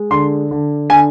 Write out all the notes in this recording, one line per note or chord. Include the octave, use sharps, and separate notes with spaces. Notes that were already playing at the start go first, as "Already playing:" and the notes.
Already playing: G#3
D3 C6
D3
D3 G#5